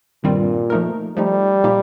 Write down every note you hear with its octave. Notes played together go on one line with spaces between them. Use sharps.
G2 A#2 D#3 G3 C4 F4
F3 A3 D#4 A#4
F3 G3 A3 D#4
A#2 F3 A#3 D#4 G4